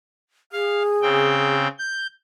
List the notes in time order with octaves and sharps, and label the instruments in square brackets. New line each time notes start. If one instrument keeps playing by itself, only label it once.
[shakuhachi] G#4 [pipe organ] F5
[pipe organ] C#3 C4 G5
G6